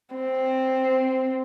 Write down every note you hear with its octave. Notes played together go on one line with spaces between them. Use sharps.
C4